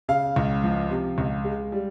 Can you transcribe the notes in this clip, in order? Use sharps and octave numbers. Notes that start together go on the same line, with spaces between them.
C#3 F5
C#2
F3
C3
C#2
G#3
G3